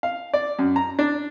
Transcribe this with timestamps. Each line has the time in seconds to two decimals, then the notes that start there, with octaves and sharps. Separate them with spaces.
0.03 F5
0.33 D5
0.59 F#2
0.76 A#5
0.99 D4